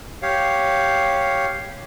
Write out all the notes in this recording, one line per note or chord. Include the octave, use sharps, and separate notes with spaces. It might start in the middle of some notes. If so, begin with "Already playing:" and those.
G4 C#5 F5